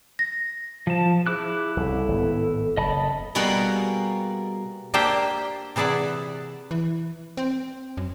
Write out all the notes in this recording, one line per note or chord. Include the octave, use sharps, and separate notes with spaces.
A#6
F3 C5 A5
E4 G#4 D6 F#6
C2 C#3 A4
G#1 A2 B3
F#1 D#5 A5 B5
B2 G3 A#3 G#4 F#5
A#3 D4 G4 C5 E5 G5
C3 E3 G#4 D5 E5 F#5
E3
C4
F#2